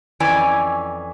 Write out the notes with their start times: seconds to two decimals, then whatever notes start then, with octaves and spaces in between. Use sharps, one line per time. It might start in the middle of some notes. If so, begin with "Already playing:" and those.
0.20 F2 E3 C#4 D5 G#5